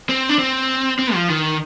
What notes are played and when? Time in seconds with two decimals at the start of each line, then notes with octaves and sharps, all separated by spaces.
0.09 C4
0.29 D4
0.39 C4
0.99 C4
1.14 F3
1.29 D#3